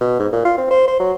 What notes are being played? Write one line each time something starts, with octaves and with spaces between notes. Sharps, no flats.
B2
G#2
A#2
F4
C4
C5
C5
F#3